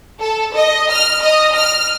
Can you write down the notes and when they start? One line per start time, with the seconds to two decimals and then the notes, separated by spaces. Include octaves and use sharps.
0.21 A4
0.55 D#5
0.91 F6
1.23 D#5
1.56 F6